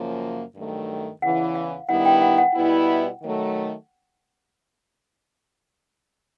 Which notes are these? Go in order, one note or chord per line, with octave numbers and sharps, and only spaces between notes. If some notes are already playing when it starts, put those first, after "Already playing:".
Already playing: F#2 C#3 F3 A#3
G2 D#3 F#3 A3
E2 C#3 E3 F#5
F5
G2 D#3 G3 B3 E4 F#5
G5
F#5
F#5
B2 G3 B3 E4
D#3 F#3 A3